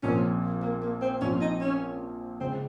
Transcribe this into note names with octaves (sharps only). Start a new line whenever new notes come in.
A#1 A#2 F3 C4 C#4
A#3
A#3
C4
A#1 A#2 F3 C4 C#4 F4
D#4
C#4
C#2 C#3 G#3 C4